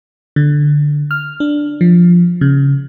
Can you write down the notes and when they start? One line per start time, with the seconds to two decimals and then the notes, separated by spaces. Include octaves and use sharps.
0.36 D3
1.11 F6
1.40 D4
1.81 F3
2.41 C#3